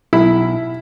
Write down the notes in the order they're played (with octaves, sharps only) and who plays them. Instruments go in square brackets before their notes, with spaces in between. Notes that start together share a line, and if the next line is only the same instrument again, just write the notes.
[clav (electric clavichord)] B1 [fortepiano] E4